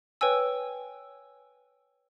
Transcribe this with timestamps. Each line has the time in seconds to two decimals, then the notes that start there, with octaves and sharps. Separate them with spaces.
0.21 B4 C#5 G5 G#5 E6